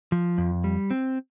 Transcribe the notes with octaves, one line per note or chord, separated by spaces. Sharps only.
F3
F2
G3
C4